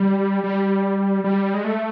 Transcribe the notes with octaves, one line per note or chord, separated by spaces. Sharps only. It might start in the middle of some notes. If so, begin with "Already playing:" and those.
Already playing: G3
G3
G3
G#3
A3